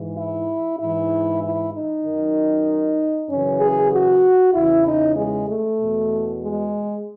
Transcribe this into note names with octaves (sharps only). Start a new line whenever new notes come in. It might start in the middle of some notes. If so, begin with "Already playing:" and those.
Already playing: G#2 E3
E4
G#2 E3 E4
E4
D#4
F#2 D#3
F#2 C#3 E3 C#4
G#4
F#4
E2 C#3 E3 E4
D#4
G#3
A3
E2 B2
G#3